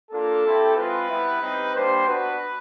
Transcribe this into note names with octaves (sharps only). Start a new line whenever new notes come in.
A#3 D4 F4 A4
C4 E4 G4
G#3 C4 F4 B4
G3 B3 E4
G3 C4 D#4
G3 A#3 D4 G4 C5
B3 D4 F#4 B4